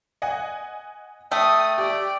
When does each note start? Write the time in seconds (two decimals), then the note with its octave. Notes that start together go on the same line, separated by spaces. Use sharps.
0.22 D#5 F#5 G#5
1.32 A3 G5 D#6
1.78 G4 D5